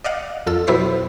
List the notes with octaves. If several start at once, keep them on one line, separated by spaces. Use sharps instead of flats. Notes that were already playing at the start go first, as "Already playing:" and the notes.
D5 D#5 F5 F#5
F2 F4 A4 E6
B2 F#3 B3 E4 C5 B6